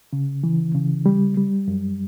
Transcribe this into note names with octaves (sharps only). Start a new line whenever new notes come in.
C#3
E3
C#3
G3
G3
F#2